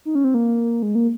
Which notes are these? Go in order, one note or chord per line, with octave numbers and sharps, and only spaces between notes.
D#4
C#4
C4
A#3
G#3
A#3